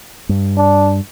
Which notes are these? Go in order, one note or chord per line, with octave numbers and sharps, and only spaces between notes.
G2
D4